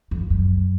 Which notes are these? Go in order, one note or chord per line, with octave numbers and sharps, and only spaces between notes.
F2
F#2